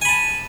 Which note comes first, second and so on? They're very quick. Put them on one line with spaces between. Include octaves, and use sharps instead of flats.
G#5 B5 A5